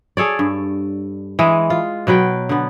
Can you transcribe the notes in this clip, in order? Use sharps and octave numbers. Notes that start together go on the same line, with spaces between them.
G#4 A4 C#5 D5
G2
E3 G#3 D#5
F4
B2 F#3 B4 G5
D3 B3